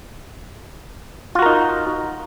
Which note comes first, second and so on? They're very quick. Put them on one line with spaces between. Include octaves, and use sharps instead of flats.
F4 F#4 A#4 D#4